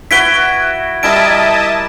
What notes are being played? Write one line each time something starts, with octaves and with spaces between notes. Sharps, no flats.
E4 F#4 B4 B6 D7 G7
G3 E4 A#4 D#5 E5 A5 D7